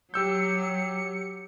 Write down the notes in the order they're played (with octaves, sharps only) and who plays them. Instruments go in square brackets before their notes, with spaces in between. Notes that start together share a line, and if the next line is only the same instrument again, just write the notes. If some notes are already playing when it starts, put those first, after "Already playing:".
[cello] F#3 [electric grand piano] G4 E6 G6 [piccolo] C#7